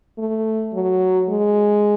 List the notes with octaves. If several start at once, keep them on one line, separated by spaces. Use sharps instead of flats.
A3
F#3
G#3